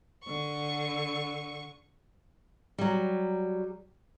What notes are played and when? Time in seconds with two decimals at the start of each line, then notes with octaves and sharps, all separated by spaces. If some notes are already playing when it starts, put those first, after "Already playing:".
0.24 D3 C#6
2.78 F#3 G3